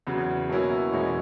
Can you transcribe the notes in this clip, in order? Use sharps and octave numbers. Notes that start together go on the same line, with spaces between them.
E2 C#3 F#3
B2 F#3 A#3 C#4 E4
E2 B2 G#3 C#4 E4